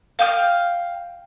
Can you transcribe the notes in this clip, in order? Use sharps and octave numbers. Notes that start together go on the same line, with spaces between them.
F5 G5 D#6 F6